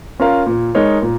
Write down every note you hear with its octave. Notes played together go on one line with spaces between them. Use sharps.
C#4 F4 A#4 F5
A#2
G#3 D#4 A#4 C#5
A#2